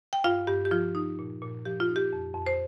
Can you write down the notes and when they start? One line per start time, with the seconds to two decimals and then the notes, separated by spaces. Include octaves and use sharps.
0.13 G5
0.24 G2 F4 F5
0.47 G2 G4
0.65 G4
0.71 F3 F4
0.95 D#4
1.19 A#2
1.42 A#2
1.65 F3 G4
1.80 F4
1.89 D#4
1.96 G4
2.13 F2
2.35 F2
2.47 C5